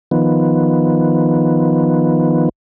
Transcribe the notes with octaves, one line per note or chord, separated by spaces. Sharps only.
D#3 F3 B3